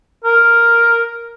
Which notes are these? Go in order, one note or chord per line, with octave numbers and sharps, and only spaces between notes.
A#4